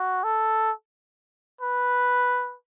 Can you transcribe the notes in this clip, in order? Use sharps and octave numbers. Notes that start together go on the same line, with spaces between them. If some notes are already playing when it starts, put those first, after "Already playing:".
Already playing: F#4
A4
B4